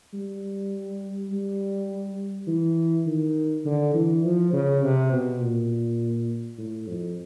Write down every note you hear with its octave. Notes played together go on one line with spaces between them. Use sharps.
G3
G3
E3
D#3
D3
E3
F3
C#3
C3
B2
A#2
A2
F2